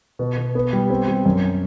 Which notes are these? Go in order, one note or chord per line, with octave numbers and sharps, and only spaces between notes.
B2
B2
B3
G3
C4
G3
F#2